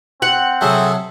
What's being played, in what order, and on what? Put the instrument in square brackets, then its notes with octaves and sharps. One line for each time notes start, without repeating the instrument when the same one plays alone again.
[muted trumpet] C4 [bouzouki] F#5
[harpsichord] C3 F#3 [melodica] G#4 A4 E5